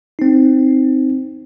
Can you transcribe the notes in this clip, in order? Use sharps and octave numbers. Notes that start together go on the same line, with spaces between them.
C4 D#4